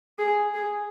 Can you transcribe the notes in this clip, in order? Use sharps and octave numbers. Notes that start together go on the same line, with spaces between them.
G#4
G#4